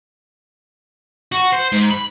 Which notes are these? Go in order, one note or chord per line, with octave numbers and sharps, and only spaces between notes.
F#4
C5
G#2
B5